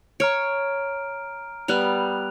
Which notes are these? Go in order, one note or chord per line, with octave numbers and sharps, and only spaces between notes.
C#5 A#5 F6 D7
G3 B3 F#6 F7